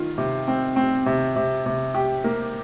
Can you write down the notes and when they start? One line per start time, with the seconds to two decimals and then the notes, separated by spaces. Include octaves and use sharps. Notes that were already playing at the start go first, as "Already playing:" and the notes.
Already playing: D#3 F4
0.18 C3
0.48 C4
0.76 C4
1.06 C3
1.36 C3
1.66 C3
1.94 G4
2.24 A#3